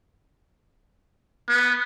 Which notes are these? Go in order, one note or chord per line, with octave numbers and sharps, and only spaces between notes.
B3